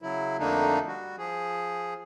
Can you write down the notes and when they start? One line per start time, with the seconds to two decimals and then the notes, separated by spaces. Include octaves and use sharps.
0.02 C#3 F#3 E4
0.39 F2 D3 A3 A#3 D4 D#4
0.87 G3 F#4
1.18 F3 G#4